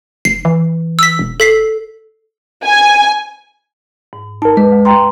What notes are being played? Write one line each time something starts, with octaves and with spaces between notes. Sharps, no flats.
F1 C7
E3
E6 B6
E1
A4 B6 C7
G#5
G#2
D#4 A#4 A5
G#3 B4
D2
G5 A#5 C6